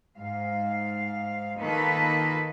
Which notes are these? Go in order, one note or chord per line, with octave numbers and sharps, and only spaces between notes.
G#2 F5
D#3 A#3 D#4 F4 A4 B4